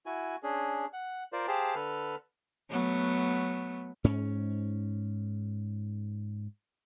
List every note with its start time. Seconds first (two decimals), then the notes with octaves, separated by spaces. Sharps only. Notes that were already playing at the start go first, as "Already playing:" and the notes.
0.06 E4 F#4 G#5
0.43 C#4 D4 G#4
0.93 F#5
1.33 F4 A#4 C5 D5
1.48 G4 G#4 C5 F5 A5
1.75 D3 A4 B4 F6
2.70 F#3 A3 B3
4.04 G#2 C#4